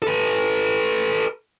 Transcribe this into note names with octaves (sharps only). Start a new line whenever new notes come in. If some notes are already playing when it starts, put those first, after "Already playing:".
A4 B4